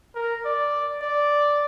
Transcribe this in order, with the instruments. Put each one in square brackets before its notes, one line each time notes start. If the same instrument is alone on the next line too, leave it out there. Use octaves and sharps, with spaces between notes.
[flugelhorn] A#4
D5
D5